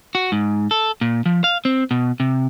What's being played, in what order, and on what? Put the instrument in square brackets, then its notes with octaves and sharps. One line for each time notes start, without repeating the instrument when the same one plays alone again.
[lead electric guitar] F#4
G#2
A4
A#2
F3
F5
C4
B2
C3